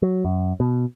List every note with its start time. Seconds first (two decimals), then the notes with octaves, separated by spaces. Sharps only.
0.02 F#3
0.25 F#2
0.60 B2